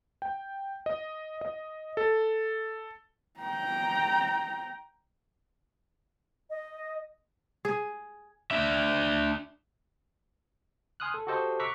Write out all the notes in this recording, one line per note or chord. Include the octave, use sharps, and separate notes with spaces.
G5
D#5
D#5
A4
G5 A#5
D#5
G#4
D4 E5
G#5 C6 D#6 F6 F#6
A4
F#4 G4 A4 C5 D#5
A#5 C#6 D6 E6 F#6 B6